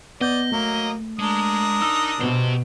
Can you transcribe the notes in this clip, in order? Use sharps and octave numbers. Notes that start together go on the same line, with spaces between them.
B3 D5 D#5 G6
F#3 A3 A#3
G#3 D4 A#4 D#6
D#4 E6
B2 G4 C5